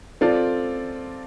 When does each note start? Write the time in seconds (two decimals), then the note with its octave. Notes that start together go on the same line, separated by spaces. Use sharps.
0.21 C4 F4 A4 D5